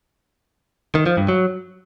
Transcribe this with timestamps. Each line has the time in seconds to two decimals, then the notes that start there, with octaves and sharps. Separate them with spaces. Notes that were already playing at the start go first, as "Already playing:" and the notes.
0.95 D#3
1.06 F3
1.17 G2
1.29 F#3